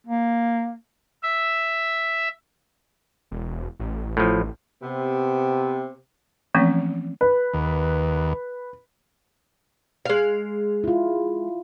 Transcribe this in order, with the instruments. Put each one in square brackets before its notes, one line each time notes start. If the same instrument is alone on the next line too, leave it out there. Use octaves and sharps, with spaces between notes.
[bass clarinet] A#3
[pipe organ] E5
[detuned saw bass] E1
A1
[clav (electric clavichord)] A2 F3
[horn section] C3 B3
[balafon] E3 F3 A3 A#3 C4 C#4
[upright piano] B4
[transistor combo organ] D#2
[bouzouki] G#3 F5
[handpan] E4 F4